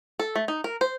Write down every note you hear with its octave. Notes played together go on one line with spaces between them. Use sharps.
A4
A3
D#4
A#4
C5